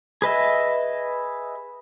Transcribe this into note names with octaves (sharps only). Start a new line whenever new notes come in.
G#4 B4 D#5 E5